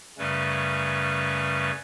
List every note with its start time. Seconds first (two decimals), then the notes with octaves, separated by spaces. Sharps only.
0.18 F#2 C#3 G3 A3 C#4 B4